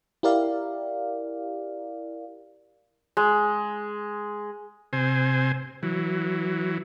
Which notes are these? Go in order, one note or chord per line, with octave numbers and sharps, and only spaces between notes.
E4 G4 A#4 D5 F5
G#3
C3 C5 G#5
E3 F#3